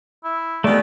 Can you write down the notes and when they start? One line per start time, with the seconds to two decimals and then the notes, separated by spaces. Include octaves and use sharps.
0.24 E4
0.64 D#2 G#3 A3 B3 D5